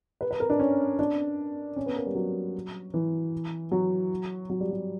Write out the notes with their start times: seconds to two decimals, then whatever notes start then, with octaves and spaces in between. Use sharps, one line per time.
0.21 B4
0.31 B4
0.40 A#4
0.50 D4
0.60 C#4
0.99 D4
1.76 C#4
1.86 B3
1.96 A#3
2.06 G3
2.15 F#3
2.94 E3
3.72 F#3
4.50 F#3
4.60 G3
4.71 F#3